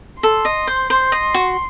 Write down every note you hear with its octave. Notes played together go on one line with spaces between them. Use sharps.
A4 C6
D#5
C5
C5
D#5
F#4